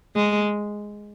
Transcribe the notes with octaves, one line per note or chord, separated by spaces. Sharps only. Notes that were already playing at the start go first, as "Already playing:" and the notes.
G#3